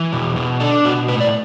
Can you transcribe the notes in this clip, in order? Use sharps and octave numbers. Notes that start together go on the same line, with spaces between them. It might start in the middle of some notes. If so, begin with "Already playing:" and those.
Already playing: E3
B2
B2
D4 A4
B2 F#4
A2 B4
D5